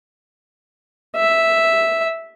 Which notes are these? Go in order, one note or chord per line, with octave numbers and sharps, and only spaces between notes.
E5